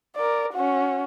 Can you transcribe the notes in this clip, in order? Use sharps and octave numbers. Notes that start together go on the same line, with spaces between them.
A#4 D5
C#4 F#4